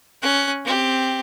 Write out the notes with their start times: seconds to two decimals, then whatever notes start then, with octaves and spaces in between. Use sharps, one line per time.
0.22 C#4 F#6
0.64 C4 G4